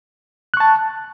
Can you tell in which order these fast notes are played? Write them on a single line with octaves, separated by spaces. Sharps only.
F#6 C#6 A5